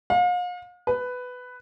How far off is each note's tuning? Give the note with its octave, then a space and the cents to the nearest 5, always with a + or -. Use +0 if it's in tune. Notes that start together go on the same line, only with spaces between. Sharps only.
F5 +40
B4 +10